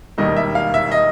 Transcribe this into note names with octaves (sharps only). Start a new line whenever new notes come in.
E1 D#2 D#3 G3 D#5
E5
F5
E5
D#5